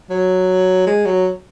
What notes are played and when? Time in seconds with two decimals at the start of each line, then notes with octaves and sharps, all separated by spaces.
0.10 F#3
0.87 G#3
1.06 F#3